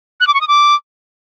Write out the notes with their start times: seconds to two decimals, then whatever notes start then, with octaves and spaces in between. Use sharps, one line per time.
0.20 F#6
0.27 D6
0.34 C#6
0.41 D#6
0.48 D6